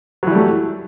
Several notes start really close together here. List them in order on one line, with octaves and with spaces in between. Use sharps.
F#3 E3 G3 A3